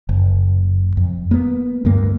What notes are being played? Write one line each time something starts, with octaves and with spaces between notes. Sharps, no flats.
F#1
F2
A#3 B3
D2 G2 A#3